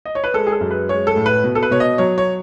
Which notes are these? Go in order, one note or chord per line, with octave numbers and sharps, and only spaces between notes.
D#5
C#5
B4
G#3 A4
G#4
A4
F#2
B4
G#3 C#5
A4
A2
B4
B2
A4
B4
B2 C#5
D#5
F#3 C#5
C#5